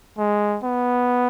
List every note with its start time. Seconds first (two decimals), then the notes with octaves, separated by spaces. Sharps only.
0.18 G#3
0.64 B3